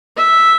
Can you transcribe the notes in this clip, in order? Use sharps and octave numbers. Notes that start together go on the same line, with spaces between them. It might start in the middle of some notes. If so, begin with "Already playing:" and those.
E5